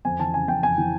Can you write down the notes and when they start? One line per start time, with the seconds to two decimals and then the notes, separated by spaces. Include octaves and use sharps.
0.05 F2 G#5
0.20 E3 A5
0.34 C#3 G#5
0.48 F2 G5
0.63 F2 G#5
0.78 E3